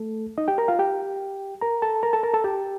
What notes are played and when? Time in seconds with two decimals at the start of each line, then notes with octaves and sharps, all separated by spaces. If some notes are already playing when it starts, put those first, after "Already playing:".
Already playing: A3 A4
0.38 D#4 D#5
0.48 G4 G5
0.58 A#4 A#5
0.68 F4 F5
0.79 G4 G5
1.61 A#4 A#5
1.82 A4 A5
2.03 A#4 A#5
2.13 A4 A5
2.23 A#4 A#5
2.34 A4 A5
2.44 G4 G5